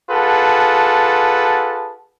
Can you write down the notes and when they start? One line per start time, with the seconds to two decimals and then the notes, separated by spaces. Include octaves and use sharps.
0.10 F4 G#4 A4 B4 F#5 A5